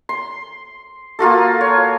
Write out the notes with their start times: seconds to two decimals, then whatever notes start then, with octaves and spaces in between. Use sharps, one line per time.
0.09 C6
1.19 A#3 F4 F#4 A4
1.61 C#5